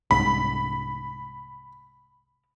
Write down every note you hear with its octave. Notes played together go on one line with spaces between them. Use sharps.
C2 G#2 B5